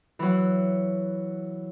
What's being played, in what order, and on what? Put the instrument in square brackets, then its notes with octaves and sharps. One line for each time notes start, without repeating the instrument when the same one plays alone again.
[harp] E3 F#3